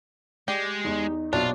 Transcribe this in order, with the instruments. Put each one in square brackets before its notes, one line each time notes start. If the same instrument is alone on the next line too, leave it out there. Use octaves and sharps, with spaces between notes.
[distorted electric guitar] G#3 [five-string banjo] G4 [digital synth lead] D5
[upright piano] E2 [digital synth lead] D#4
[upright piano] A#1 B2 F#3 [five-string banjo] D4 [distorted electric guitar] F4